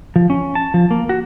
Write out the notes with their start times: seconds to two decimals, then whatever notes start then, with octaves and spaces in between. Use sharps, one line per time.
0.16 F3
0.30 C#4
0.55 A5
0.74 F3
0.91 A#3
1.09 F#4